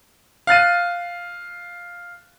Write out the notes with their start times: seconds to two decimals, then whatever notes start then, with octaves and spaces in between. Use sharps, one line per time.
0.47 F5 F#6 A6 D#7